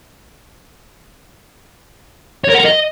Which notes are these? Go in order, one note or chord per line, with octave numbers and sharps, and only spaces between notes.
C#5
A#4
F#5
A#4
D#5